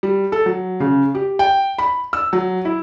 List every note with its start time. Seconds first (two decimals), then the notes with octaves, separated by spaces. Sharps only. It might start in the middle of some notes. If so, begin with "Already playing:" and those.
0.03 G3
0.32 A4
0.46 F#3
0.80 C#3
1.15 G4
1.39 G5
1.78 B5
2.13 E6
2.33 F#3
2.65 E4